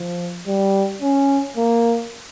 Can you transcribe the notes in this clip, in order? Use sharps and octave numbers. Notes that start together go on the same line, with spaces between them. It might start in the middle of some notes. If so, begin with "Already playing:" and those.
Already playing: F3
G3
C#4
A#3